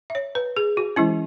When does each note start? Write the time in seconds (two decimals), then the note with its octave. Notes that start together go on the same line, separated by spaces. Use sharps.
0.10 E5
0.15 C#5
0.35 B4
0.57 G#4
0.77 F#4
0.96 E3 G#3 C#4 E4